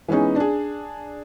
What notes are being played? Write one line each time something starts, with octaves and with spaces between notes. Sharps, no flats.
E3 G#3 B3 C#4 D#4
D4 G#4